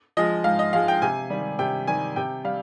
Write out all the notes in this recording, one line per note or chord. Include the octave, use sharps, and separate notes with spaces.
F3 G#3 D#5
G#2 F5
D#5
F3 G#3 F5
G5
C3 G#5
D#3 G3
C3 G5
D#3 G3 G#5
C3 G5
G3 F5